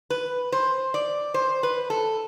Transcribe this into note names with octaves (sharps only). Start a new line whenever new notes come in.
B4
C5
D5
C5
B4
A4